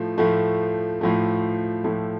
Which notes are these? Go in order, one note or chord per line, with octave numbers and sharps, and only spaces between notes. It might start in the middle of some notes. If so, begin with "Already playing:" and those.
Already playing: A2 F3 A3
A2 F3 A3
A2 F3 A3
A2 F3 A3